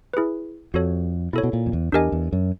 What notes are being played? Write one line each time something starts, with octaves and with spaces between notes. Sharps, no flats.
E4 G#4 B4
F2 F#4 A4 C#5
B2 E4 A4 C#5
B2
A#2
F2
E2
E2 D4 G4 A#4 D#5 G#5
E2
F#2